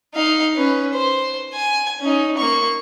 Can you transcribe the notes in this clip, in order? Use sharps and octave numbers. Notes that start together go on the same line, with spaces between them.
D#4 F5
C#4 B4
C5
G#5
C#4 D#4
A#3 C#6